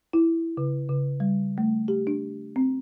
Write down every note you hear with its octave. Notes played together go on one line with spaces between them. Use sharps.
E4
C#3
C#3
G3
A3
G4
D4
C4